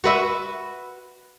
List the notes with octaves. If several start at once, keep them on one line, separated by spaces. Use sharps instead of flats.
F#4 B4 E5